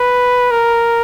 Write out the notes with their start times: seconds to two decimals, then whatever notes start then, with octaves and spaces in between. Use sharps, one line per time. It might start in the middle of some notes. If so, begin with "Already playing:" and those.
Already playing: B4
0.51 A#4